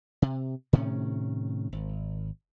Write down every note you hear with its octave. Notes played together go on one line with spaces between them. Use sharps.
C3
A2 C3 D#3 C#4
G#1